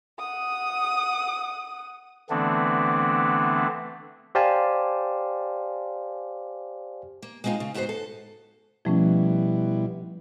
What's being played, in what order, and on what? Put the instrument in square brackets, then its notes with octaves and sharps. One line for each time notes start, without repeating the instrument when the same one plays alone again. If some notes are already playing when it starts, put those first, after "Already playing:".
[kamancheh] F#5 D#6
[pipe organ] D3 E3 A3 B3 C4 D4
[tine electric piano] G4 C5 D5 F5 G#5 A5
[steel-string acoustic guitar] A#3
G#3 B3 C4 D#4 F4
C#3
G#2 B3 F#4 G#4 C5
A4
[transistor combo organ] B2 G3 E4 [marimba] F3 A3 C#4